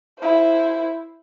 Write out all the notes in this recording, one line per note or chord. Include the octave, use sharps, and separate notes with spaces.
E4 C5